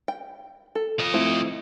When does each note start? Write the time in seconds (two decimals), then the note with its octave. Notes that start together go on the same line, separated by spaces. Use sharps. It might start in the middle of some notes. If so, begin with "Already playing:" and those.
0.08 G5
0.75 A4
0.99 F3 D#5
1.14 A3 C4 E4